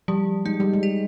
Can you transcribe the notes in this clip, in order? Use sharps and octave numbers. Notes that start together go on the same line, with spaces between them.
F3 G3
G#3 D#4
G3
G#3
G4